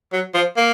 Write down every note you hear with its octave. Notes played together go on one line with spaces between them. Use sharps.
F#3
F3
A#3